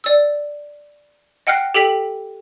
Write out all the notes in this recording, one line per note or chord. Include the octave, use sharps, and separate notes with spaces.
D5 E6
D#5 F#5 G5 F6 F#6 C7
G4 A4 G5 B6 F#7